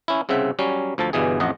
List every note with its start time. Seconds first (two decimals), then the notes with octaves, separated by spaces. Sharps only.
0.08 C#4 E4
0.29 C2 C#3 C4 E5 F#5
0.59 F#3 G3 C#4
0.98 D2 F3 A4 A5
1.13 G1 G2 B2 E3 G#4
1.40 A1 F2 D#5 F#5